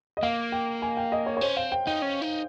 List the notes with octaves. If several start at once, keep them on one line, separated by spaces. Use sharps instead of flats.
D#5
A#3 F5
G5
G#5
G5
D#5
C#5
C#5
C#4 C5
C4 F5
G5
D#4 G5
C#4
D#4